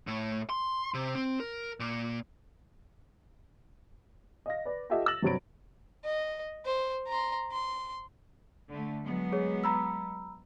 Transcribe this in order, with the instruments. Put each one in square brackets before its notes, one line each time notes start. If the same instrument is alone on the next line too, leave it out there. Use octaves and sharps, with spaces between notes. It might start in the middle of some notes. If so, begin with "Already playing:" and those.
[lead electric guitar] A2
C6
C3
C4
A#4
A#2
[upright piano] D#5 F5 A#6
B4 D5
F4 G4 A4 D#5 E5 F#5
E6 A6 A#6 F#7
G1 C3 F#3 C#5 B5 D7
[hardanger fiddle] D#5
C5
A#5 C6
C6
[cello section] D3 A3
F#3 G#3 B3
[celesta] G#4 C#5
A#5 B5 E6